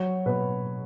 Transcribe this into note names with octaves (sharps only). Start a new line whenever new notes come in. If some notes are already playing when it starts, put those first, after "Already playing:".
Already playing: F#3 C#5
B2 B4